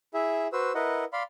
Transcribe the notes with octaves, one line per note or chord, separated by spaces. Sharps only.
E4 G#4 E5
F#4 B4 C5 E6
E4 A#4 B4 D#5 F#5
D5 F5 B5 C6